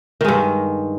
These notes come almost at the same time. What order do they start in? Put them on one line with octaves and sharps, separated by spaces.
D#3 G#3 G2